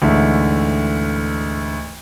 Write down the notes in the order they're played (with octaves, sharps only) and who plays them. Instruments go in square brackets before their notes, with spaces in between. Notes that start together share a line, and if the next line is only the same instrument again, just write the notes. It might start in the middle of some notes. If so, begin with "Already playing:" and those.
[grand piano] D2 G#2 D3 E3 A3